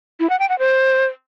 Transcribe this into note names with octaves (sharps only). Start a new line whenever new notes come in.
E4
F#5
G5
F#5
C5